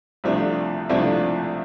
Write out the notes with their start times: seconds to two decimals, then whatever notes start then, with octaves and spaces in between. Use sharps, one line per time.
0.24 C2 C3 F3 A3 D4
0.89 C2 C3 F3 A3 D4